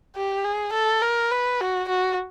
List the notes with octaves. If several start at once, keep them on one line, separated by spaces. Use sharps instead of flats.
G4
G#4
A4
A#4
B4
F#4
F#4